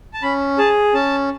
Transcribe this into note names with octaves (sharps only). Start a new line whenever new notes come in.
A5
C#4 B5
G#4 A5
C#4 A5